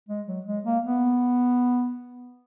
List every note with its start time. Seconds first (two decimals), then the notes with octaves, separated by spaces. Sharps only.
0.09 G#3
0.27 F#3
0.46 G#3
0.65 A#3
0.84 B3